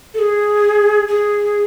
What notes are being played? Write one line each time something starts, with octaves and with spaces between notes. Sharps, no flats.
A4
G#4
G#4